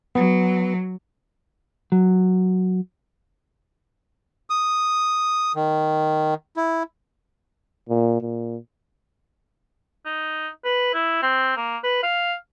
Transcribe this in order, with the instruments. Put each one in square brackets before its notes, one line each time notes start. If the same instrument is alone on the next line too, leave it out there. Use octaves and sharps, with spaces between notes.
[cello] F#3 [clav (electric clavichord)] B3
[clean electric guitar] F#3
[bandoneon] D#6
D#3
E4
[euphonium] A#2
A#2
[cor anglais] D#4
B4
E4
C4
A#3
B4
F5